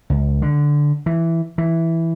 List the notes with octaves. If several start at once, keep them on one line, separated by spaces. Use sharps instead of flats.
C#2
D3
E3
E3